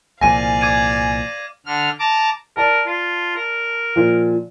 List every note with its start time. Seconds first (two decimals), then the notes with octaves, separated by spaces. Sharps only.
0.21 C2 A#2 F3 D5 F5 G#5 A#6 D#7
0.61 D6 G#6 D#7
1.66 D3 F6
1.99 A5 A#5 D6
2.57 A#4 D5 A5
2.87 F4
3.36 A#4
3.96 A#2 F3